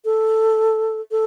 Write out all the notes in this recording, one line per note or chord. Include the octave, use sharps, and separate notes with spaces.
A4
A4